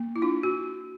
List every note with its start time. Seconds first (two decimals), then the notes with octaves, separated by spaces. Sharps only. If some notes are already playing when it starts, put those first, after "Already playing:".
Already playing: A#3
0.16 E4
0.22 D4 F4
0.43 F#4